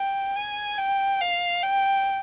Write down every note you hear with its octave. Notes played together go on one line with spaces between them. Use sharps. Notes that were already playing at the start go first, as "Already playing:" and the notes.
Already playing: G5
G#5
G5
F5
G5